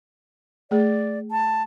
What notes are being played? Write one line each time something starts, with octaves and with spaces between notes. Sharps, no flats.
A3 G#4 D5
A5